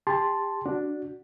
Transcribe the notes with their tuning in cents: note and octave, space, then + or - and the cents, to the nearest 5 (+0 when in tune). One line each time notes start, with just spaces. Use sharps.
G4 +30 A5 +0 C6 +0
D4 +0 F#4 +0